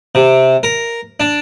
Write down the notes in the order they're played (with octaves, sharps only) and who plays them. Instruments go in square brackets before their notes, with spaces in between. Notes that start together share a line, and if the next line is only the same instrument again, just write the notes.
[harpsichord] C3
A#4
D4